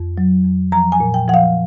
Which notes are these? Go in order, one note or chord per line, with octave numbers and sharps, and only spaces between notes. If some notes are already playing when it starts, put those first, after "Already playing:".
Already playing: F2
F#3
F2
F3 A#5
G#5
A#2
G5
F3 F#5
F5